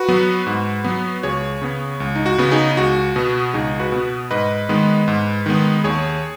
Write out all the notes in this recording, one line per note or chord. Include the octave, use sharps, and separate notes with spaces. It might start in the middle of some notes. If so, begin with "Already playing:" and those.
Already playing: F#4 B4
F#3 B3
G#2
F#3 B3
C#2 G#4 C#5
C#3 B3
C#2
D#4
F#4
C#3 B3
D#4 G#4
C#2 F#4
B2 B3
C#2 D#4 G#4
F#4 B4
B2 B3
G#2 B4 D#5
D#3 G#3 B3
G#2
D#3 G#3 B3
D#2 G#4 C#5